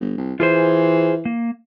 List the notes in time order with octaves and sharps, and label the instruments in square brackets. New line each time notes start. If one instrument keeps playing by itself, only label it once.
[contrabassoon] G1
C2
[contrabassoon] E3 [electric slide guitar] F4 G#4 C5
[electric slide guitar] A#3